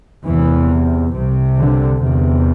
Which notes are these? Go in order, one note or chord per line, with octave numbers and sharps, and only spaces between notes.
E2 C3 E3
C2 C3
D3
E2 C3